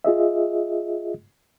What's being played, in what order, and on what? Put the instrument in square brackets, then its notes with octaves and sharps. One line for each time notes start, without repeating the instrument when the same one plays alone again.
[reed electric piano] F4 G#4 D#5 E5